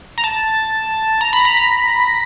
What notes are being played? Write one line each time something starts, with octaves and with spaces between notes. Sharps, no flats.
A#5
A5
A#5
B5
A#5
A#5